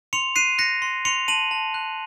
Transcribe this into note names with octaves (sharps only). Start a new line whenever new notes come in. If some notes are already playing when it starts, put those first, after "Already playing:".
C6 C#7 F7
F#6 C7 D#7
F#6 A#6 C#7
C6
C6 C#7 F7
A5 D#7 F#7
A5
F#6